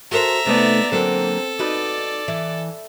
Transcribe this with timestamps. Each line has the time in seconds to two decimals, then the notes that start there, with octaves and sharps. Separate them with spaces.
0.11 F#4 A4 A#4 C5 E5 A#5
0.46 C3 A3 B3 D#4 D5
0.92 D3 F#3 A#3 C4 A4
1.59 D#4 F#4 B4 D5
2.28 E3